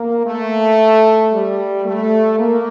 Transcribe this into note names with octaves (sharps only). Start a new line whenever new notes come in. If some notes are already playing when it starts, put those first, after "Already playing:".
Already playing: A#3
A3
G3
A3
A#3